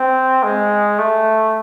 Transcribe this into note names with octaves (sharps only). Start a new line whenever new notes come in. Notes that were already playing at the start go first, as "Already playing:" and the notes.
Already playing: C4
G#3
A3